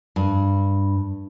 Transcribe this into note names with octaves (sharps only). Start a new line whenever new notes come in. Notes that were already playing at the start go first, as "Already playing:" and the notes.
G2